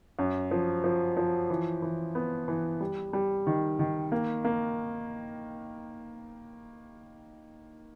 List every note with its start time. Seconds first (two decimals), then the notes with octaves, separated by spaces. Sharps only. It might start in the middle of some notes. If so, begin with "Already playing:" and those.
0.19 F#2
0.51 F3
0.84 F3
1.17 F3
1.50 E3
1.82 E3
2.15 B3
2.48 E3
2.80 G3
3.13 G3
3.47 D#3
3.79 D#3
4.12 A#3
4.45 A#3